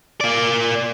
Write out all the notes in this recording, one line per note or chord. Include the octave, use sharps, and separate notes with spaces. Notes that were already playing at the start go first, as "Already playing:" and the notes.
A#3 D5